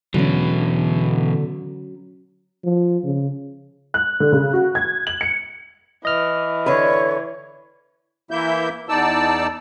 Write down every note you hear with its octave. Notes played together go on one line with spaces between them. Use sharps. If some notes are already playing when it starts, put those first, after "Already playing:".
B2 D3 E3 F#3 C#4
F3
C#3
F#6
D3
C#3
F#4
G#6
F#7
C#7
E3 D#5 F6
D3 B4 C#5
E3 A#3 E4 E5 G6
E2 D#4 D5 A5 E6